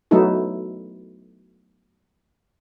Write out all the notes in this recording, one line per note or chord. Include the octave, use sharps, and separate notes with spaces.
F#3 A3 B3 D#4 E4 A4